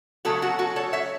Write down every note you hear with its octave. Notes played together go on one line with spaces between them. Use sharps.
C#3 F#3 A3 F#4 A4
F#4 A4
F#4 A4
A4 C#5
C#5 E5